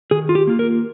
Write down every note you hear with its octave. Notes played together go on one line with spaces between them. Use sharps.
D#3 G#4
F4
G4
A#3 F4
A#4